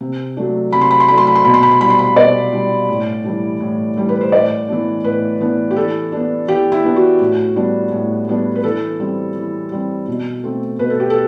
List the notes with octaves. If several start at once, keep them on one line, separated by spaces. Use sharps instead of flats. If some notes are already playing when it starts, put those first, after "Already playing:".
C3
F#3 A3 D4
C3 B5
C6
B5
C6
F#3 A3 D4 B5
C6
B5
C6
B2 B5
C6
B5
C6
G3 D4 B5
C6
B5
B2 D5
G3 D4
A2
E3 G3 D4
A2
E3 G3 D4
B4
C5
A2 D5
E3 B3 D4
A2 B4
E3 B3 D4
G4
E3 A4
B3 D4
E3 G4
E4
B3 D4
F#4
A2
G3 B3 D4
A2
G3 B3 D4
B4
E3 A4
G3 C4
E3
G3 C4
B2
A3 C4
B2 B4
A4
G4
A4